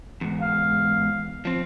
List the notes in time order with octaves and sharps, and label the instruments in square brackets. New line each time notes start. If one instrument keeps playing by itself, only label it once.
[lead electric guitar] E2 G#2
[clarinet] F5
[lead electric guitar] F3 C4